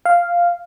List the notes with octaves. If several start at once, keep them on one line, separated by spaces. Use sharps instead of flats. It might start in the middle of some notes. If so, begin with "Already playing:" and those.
F5